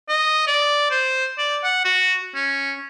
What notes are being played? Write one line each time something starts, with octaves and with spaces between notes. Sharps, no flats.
D#5
D5
C5
D5
F#5
F#4
C#4